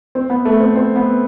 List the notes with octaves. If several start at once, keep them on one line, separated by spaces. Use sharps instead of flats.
C4
B3
A3
C4
C4
B3